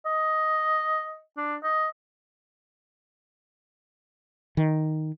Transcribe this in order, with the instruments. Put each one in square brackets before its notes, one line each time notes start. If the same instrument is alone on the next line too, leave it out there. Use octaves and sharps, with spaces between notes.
[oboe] D#5
D4
D#5
[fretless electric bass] D#3